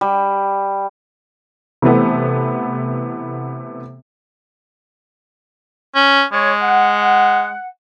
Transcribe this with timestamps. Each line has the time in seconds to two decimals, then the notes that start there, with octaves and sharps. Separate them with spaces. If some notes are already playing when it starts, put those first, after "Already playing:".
0.01 G3
1.82 C3 E3 A3 B3
5.95 C#4
6.33 G#3 C#5
6.62 F#5